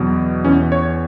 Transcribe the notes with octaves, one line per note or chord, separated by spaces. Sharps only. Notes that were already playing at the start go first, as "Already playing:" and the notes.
Already playing: E2 B2 F#3
E2 E3 C#4
C#5